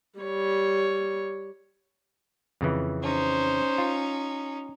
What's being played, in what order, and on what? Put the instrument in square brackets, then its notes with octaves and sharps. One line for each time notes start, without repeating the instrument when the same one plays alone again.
[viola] G3 C#5
[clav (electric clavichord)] F2 C#3 E3
[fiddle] C#4 D#4 [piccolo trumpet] C5
[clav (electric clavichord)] F4